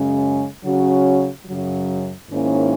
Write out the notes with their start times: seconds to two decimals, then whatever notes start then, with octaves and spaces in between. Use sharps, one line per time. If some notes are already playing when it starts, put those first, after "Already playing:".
Already playing: F#2 C#3 G#3 C#4
0.62 C#3 F#3 C#4 F#4
1.45 F#2 C#3 F#3
2.28 G#2 D#3 A#3 C#4 E4